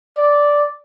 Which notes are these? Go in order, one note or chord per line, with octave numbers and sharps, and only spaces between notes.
D5